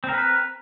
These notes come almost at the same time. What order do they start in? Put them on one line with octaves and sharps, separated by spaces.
C4 A#4 B4